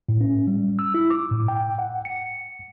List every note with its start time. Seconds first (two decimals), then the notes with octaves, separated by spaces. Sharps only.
0.09 A2
0.21 C#4
0.47 G3
0.79 E6
0.94 E4
1.10 D6
1.31 A2
1.48 G5
1.78 F#5
2.05 C#7